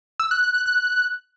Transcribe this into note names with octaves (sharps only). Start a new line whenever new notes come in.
E6
F#6
F#6
F#6
F#6